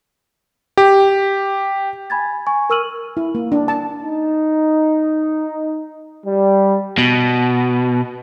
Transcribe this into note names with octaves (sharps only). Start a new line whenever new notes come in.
G4
G#5 B5 G#6 A6
G#5 C#6
A#4 C#6 E6 F6 D#7 F#7
E4
A#3
D4
A5
D#4
G3
B2